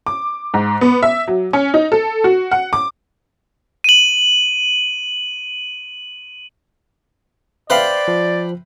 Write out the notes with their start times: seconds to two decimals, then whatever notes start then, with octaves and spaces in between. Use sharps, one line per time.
0.07 D6
0.54 G#2
0.81 B3
1.03 E5
1.28 F#3
1.53 C#4
1.74 D#4
1.92 A4
2.24 F#4
2.51 F#5
2.73 D6
3.84 D#7 F#7
7.70 B4 C5 D5 E5 F5 G5 B5
8.08 F3